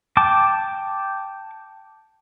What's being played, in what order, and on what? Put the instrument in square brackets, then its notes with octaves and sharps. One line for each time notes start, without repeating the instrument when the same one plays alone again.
[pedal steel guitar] G5 A5 D6